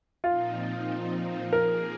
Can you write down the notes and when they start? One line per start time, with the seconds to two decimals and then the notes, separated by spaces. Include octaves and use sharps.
0.24 A#2 F3 C4 D#4 F4
1.52 F3 A#3 G#4 A#4